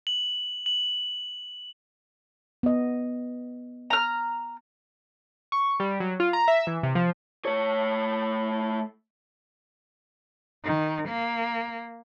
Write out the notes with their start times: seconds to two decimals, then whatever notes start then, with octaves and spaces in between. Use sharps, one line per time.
0.07 F#7
0.66 F#7
2.63 B3 D#5
3.90 A#5 F6
5.52 C#6
5.80 G3
6.00 F#3
6.20 F4
6.33 A#5
6.48 E5
6.67 E3
6.83 C3
6.95 F3
7.45 A3 C#5
10.65 D#3
11.09 A#3